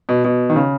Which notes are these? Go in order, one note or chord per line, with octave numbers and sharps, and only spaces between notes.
B2
B2
D#3
C#3